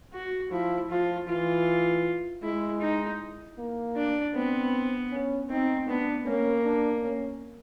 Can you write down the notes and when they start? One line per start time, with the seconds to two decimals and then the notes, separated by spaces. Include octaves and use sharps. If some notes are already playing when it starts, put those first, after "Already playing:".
0.13 F#4
0.51 F3 E4
0.90 F3 F4
1.28 E3 F4
2.43 G#3 E4
2.81 D#4
3.58 A#3
3.96 D4
4.35 B3 C4
5.12 C#4
5.50 C4 D#4
5.88 B3 D4
6.26 A#3 C#4
6.64 D4
7.03 C#4